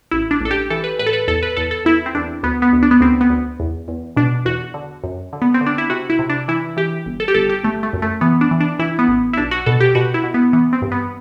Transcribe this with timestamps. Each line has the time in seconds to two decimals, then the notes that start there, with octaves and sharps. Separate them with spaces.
0.11 A1 E4
0.31 D4
0.40 A1 A4
0.51 G4
0.70 E3 A4
0.84 B4
0.99 A2 B4
1.06 A4
1.13 B4
1.28 E2 A4
1.43 B4
1.57 E2 A4
1.71 A4
1.85 E2 E4
2.06 C4
2.15 E2 D4
2.43 D2 B3
2.62 B3
2.73 D2
2.83 D4
2.91 B3
3.01 D2 C4
3.21 B3
3.30 D2
3.60 E2
3.88 E2
4.17 B2 D4
4.45 E2 F#4
4.74 D3
5.04 F#2
5.33 D3
5.42 B3
5.54 C4
5.61 D3
5.66 D4
5.78 E4
5.90 C3 F#4
6.10 E4
6.19 C3
6.30 D4
6.48 E3 E4
6.77 E3 G4
7.06 G1
7.20 A4
7.28 G4
7.35 G1 A4
7.49 G4
7.63 G1 A3
7.83 A3
7.93 F#2
8.02 A3
8.21 E3 B3
8.41 D4
8.51 E3
8.60 D4
8.79 E3 E4
8.99 B3
9.08 A1
9.33 E4
9.37 B1 D4
9.51 F#4
9.66 B2 A4
9.81 G4
9.95 B2 F#4
10.14 E4
10.23 B2
10.34 B3
10.53 E3 B3
10.73 C4
10.82 G2
10.92 B3